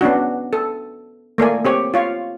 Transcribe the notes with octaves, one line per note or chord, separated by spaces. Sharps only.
B3 C#4 D4 F#4
A4
A3 A#3 D5 G#5
C4 G4 C#5
F4 C#5 F5